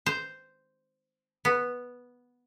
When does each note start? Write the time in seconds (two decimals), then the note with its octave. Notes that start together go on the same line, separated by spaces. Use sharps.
0.06 C5
1.45 B3